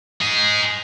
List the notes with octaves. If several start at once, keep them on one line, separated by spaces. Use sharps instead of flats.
D#4 G#4